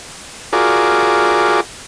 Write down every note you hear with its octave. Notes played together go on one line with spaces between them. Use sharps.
F4 F#4 G#4 A#4 D5